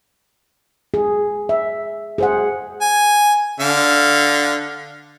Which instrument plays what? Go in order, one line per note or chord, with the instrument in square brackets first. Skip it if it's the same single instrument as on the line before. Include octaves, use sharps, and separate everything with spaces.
[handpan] G#4
E5
G#4 C5 F#5
[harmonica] G#5
D3 F5